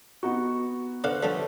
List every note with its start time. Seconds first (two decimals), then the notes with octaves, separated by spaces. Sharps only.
0.23 B3 D#4 F#4 C#6
1.04 D3 B4 C5 D5 F5 F#6
1.23 D3 F3 G3 C#5 E5 A5